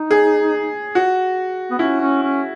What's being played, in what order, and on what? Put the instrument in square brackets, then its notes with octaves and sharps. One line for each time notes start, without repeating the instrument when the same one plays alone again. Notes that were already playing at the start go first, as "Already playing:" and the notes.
Already playing: [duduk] D#4
[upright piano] G#4
F#4
[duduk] B3
[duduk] C#4 [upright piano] E4
[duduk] C#4
C#4